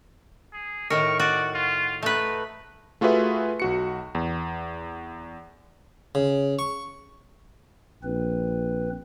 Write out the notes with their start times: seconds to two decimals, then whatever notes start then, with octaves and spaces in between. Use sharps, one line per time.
0.53 G#4
0.90 A2 D#3 A#4 C#6
1.19 F#4 D5
1.54 F4
2.03 A3 D#4 B4
3.01 A3 F4 F#4 G#4 B4 E5
3.60 B1 F#4 C#7
4.15 E2
6.15 C#3
6.59 C#6
8.03 A#1 C4 B4